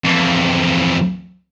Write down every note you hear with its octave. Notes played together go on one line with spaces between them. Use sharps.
F2 E3